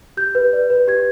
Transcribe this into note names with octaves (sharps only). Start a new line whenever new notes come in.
G4 G6
B4
D5
B4
G4 G#6